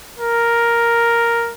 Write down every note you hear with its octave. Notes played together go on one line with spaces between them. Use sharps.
A#4